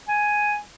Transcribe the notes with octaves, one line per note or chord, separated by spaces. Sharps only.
G#5